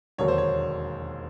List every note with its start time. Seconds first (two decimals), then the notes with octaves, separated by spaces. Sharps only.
0.18 E1 D#2 D3 F#3 A#3 C#5
0.28 C5
0.38 C#5